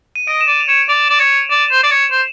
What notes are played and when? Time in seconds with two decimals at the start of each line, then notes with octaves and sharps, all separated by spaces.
0.16 D#7
0.28 D#5 D7
0.41 E7
0.47 D5 D#7
0.60 F7
0.68 C#5 E7
0.88 D5 F7
1.10 D5
1.19 C#5
1.50 D5 E7
1.59 D#7
1.68 C5 E7
1.83 D5
1.91 C#5
2.11 C5